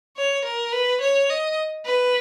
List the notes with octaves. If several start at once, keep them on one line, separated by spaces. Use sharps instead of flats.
C#5
A#4
B4
C#5
D#5
B4